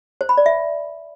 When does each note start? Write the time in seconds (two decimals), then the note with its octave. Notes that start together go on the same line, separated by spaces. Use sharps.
0.21 C5
0.29 B5
0.37 D5
0.46 E5